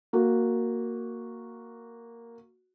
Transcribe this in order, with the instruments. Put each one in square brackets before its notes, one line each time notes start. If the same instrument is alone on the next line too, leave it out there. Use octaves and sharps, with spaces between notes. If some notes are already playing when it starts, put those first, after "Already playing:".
[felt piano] A#3 F#4